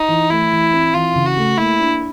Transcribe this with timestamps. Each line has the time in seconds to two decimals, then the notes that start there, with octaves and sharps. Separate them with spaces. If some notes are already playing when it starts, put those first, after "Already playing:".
Already playing: D#4
0.08 E3
0.30 A3 E4
0.52 E3
0.73 C4
0.94 E3 F4
1.15 C#3
1.26 F#4
1.36 A3
1.57 A#3 E4
1.79 D4